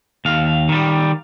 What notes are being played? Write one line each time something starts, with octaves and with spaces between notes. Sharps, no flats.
D#2 F5
D#3 G3